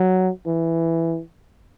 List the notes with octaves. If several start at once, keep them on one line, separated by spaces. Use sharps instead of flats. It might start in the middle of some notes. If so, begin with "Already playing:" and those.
Already playing: F#3
E3